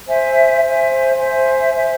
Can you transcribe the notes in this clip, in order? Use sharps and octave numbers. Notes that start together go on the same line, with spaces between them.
C5 E5 G#5
C5 E5 G#5
C5 E5 G#5
C5 E5 G#5